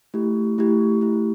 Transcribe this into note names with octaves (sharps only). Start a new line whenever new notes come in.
A3 E4 G4
A3 E4 G4
A3 E4 G4